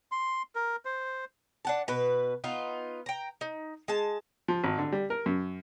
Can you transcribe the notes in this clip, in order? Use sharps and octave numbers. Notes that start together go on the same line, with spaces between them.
C6
A#4
C5
D4 F#5 A5
B2 B4
B3 D#4 F4
G5 A#5
D#4
G#3 A5
F3
G#1
D3
G3
A#4
F#2